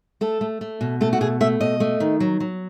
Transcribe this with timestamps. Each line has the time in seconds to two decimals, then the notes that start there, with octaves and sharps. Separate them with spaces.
0.21 A3 A4
0.41 A3
0.61 A3
0.81 B2
1.01 A3 A4
1.13 F#4
1.21 B2 G#4
1.41 A3 E5
1.61 B2 D#5
1.80 A3
2.00 D#3
2.20 F#3
2.40 F#3